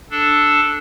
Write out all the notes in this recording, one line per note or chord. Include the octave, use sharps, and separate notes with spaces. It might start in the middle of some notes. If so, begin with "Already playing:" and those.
D4 A4